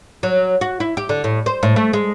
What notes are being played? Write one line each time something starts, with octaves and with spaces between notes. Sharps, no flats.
F#3
F#4
E4
G4
D3
A2
C5
A2
A3
G#3